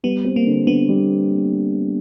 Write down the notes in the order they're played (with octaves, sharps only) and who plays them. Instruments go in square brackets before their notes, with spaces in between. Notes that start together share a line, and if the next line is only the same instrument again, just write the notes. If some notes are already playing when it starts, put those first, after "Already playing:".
[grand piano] G3 [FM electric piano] B3
[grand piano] C4
[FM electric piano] A#3
[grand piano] D3
[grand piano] D3 [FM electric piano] B3
[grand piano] G3